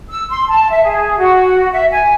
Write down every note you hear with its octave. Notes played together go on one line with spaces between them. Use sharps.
E6
C6
A5
E5
G#4
F#4
E5
G#5